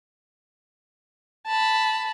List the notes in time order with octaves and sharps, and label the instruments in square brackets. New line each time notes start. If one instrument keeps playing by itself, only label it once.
[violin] A5 B5